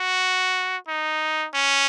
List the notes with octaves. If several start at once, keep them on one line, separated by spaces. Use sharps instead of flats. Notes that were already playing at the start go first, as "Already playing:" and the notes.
Already playing: F#4
D#4
C#4